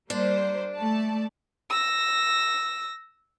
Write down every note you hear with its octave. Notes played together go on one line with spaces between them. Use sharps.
G3 A#3 D4 C5
A3 D5 A5
E6 A#6